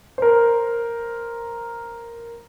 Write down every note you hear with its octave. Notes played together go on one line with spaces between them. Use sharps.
A#4 C5